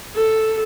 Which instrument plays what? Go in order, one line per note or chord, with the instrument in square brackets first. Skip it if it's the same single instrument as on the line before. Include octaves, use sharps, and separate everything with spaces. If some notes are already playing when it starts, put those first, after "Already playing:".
[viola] A4